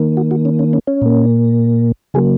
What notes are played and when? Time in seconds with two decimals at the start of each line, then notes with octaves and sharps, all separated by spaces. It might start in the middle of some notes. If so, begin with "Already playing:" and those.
Already playing: D#3 A#3
0.17 F#4
0.31 F#4
0.45 C#4
0.59 C#4
0.73 C#4
0.87 C#4
1.02 A#2 A#3
2.14 C#3 F#3 A#3 G#4